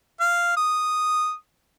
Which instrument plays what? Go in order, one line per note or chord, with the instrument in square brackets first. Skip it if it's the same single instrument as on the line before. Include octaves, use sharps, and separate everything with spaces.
[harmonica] F5
D#6